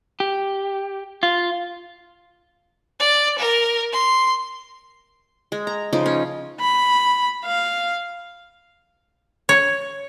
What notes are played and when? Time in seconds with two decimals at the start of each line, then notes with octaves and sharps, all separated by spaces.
0.20 G4
1.23 F4
3.00 D5
3.39 A#4
3.92 C6
5.52 G#3
5.67 A#5
5.93 C#3 F3 D#4
6.06 C#4
6.61 B5
7.45 F5
9.49 C#5